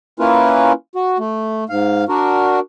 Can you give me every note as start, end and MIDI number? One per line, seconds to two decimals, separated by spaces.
0.20 0.72 58
0.20 0.72 61
0.20 0.72 64
0.20 0.72 65
0.20 0.72 70
0.20 0.72 71
0.95 1.18 66
1.19 1.64 57
1.69 2.04 44
1.69 2.04 77
2.09 2.59 62
2.09 2.59 66
2.09 2.59 70